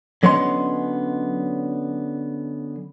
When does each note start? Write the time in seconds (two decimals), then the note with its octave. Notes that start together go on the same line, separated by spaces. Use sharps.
0.23 D3 F#3 B3 C#4 D#5 C6